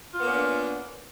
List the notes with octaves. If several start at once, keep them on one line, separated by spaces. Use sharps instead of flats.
A#3 B3 C#4 D4 F4